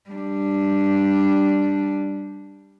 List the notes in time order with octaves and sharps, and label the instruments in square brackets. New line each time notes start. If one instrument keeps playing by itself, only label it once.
[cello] G3 D4